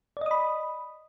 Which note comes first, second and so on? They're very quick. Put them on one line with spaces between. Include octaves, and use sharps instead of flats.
D5 D#5 D#6 B5